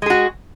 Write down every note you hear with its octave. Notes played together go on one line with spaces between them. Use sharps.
G#3 F#4 G#4